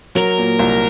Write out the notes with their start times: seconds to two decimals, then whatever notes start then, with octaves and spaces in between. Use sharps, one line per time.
0.15 F#3 A#4
0.38 A#2
0.59 C2